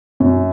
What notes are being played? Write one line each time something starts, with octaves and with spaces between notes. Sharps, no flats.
F#2